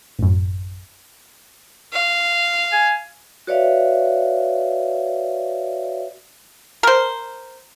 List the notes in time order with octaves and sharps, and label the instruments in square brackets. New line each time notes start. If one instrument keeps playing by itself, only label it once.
[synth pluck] A1 F#2
[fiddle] F5
[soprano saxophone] G#5
[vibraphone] F#4 B4 C#5 D5 E5 F5
[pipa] A#4 C5